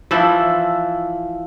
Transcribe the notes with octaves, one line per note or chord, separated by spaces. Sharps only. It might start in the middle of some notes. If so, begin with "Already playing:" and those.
E3 F3 E4